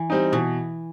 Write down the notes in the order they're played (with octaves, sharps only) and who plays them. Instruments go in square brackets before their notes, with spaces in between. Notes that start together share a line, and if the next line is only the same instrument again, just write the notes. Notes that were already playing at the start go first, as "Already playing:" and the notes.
Already playing: [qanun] E3
[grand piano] G3 C4 D#4
[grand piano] B2 [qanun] E3